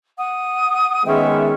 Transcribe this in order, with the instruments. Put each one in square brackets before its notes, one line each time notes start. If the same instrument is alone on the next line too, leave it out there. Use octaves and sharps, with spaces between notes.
[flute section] F#5 D#6
[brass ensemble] D#3 G#3 B3 [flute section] C#4 E5 G5